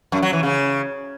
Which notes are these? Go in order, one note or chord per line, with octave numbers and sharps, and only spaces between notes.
F#2
F#3
E3
C#3